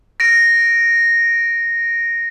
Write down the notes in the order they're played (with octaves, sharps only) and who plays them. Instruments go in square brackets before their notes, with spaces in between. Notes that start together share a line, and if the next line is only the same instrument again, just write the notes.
[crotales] A#6 D7